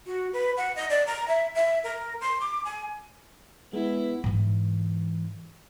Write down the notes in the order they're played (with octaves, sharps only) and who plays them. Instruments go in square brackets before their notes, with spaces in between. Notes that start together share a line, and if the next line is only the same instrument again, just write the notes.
[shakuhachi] F#4
B4
F#5
D#5
D5
A#5
E5
E5
A#4
C6
D6
G#5
[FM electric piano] G#3 [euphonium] B3 [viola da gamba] E4
[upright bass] G#2 E3